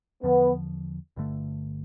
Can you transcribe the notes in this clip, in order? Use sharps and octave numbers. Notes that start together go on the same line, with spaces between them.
E2 D3 F3 B3
G1 G2 D3 A3